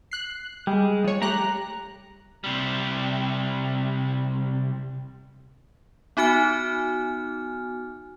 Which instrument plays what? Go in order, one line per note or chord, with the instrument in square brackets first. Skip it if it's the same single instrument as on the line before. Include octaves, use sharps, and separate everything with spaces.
[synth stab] F#6 C7
[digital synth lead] G3 [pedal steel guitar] G#3
[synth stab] F3 C#5
[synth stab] A3 G4 F#6 [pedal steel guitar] A#5
[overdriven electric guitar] C3 G3
[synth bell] B3 D#4 F#4 G#5 F6